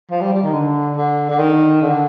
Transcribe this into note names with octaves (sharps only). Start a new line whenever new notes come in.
F3
G3
G3
D#3
D3
D3
D3
D#3
D3